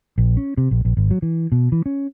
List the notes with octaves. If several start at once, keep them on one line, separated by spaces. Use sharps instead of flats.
A#1
C#4
C3
A#1
A#1
G#1
F#3
E3
B2
E3
C#4